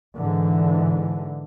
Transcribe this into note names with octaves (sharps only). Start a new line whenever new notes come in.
G#2 D3 E3